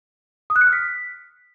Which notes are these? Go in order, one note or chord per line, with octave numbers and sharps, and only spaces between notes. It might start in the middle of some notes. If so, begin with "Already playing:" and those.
D#6
F#6
C#7
F6
B6